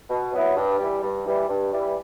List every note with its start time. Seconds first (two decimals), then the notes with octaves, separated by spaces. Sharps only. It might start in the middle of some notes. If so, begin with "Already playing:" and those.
0.09 B2
0.33 F#3 B3 E4
0.57 G2
0.79 E3 G3
1.03 G2
1.26 E3 G3
1.49 G2
1.72 E3 G3